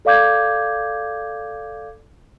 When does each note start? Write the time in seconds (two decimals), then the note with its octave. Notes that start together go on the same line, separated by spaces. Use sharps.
0.05 A4 D5 F5 D6 G6 G#6